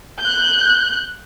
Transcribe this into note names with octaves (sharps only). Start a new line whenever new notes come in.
F#6 G6